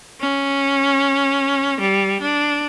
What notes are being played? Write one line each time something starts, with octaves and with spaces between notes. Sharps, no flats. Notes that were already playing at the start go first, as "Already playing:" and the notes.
C#4
G3
D4